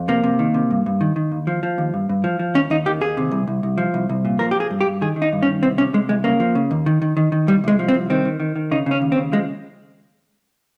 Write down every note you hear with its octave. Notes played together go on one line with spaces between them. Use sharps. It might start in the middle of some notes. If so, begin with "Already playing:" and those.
Already playing: F2
C3 A#3
C3
D#3
C3
G2
G2
D#3
D#3
D#2
F3
F3
D#2
G2
G2
F3
F3
D#2 C#4
D#2 D#4
D#3 G4
D#2 G#4
C3
C2
C2
C2
F3
C2
C2
A#2
F3 A#4
G4
F3 G#4
G2
G4
G2
D#3 G#4
D#3
D#4
G2
C#4
D#3
C2 C4
C3 C#4
C3 G#3
C2 G#3
C#3 A#3
F3
C#3
D#2
D#3
D#3
D#3
D#3
C2 G3
C2 G#3
F3
C4
C2
D#3 C4
D#3
D#3
D#3
C#3 D#4
C#3 C#4
D#2
C4
C#3
F3 G#3